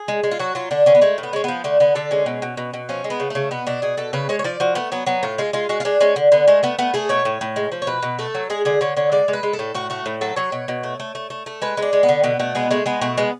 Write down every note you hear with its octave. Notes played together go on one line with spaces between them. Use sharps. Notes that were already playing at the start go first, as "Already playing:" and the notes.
Already playing: G#4
G#3
G#3
F4
F#3 F#4
F#3 F4
D3 D4
D3 C#4
B3
G#3 A3
A2
B3
G#3 C#4
F3 B3
D3 A3
D3 B3
D3 A4
G#3 C#4
B2
B2
B2
B2
F3 C#4
G#3
B3
C#3
C#3 A3
B2 B3
B2 D4
B2 G#4
B2 A4
C#3 B4
G#3 C#5
C#5
F3 D5
F3 F#4
A3 B3
F#3 B3
F#3 B3
A2 F4
G#3 F4
G#3 F4
G#3 F#4
F4
G#3 D4
G#3 C#4
D3
D3 B3
G#3 A3
A3 B3
A3 B3
A3 G#4
B2 C#5
A2
A2
G#3
F3
C#5
B2 B4
B2
A3 A4
F#3
G#3 G#4
D3 G#4
D3 C#5
D3 C#5
G#3 D5
G#3
B4
G#3
A4
A2
A2 F#4
A3 F#4
A2
F#3 A4
F#3 C#5
B2
B2
A3
A3
A3
A3
A3
G#3 B4
G#3
D4
G#3
B3
D3
B2 B3
B2 A3
G#3 B3
G#3 A3
G#3 B3
B2 A3
G#3 B3